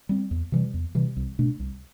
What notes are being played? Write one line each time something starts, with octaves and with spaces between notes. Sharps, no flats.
G3 C4
E2
C3 E3 G3
E2
C3 E3 G3
C2
B2 A3 D4
C2